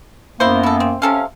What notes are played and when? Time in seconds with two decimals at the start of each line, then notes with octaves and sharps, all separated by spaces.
0.40 F#2 A#3 B3 E4 C5
0.63 E4 A4
0.80 C4
1.02 C3 C#4 A4 F5